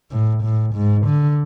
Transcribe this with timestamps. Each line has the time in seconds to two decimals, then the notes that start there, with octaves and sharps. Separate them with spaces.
0.11 A2
0.43 A2
0.75 G#2
1.07 D3